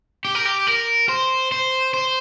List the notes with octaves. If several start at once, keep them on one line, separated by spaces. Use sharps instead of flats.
G4
A#4
G4
A#4
C5
C5
C5